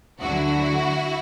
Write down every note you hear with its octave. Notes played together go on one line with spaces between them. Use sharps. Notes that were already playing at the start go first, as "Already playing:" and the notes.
D2 D3 F#3 E4 F#4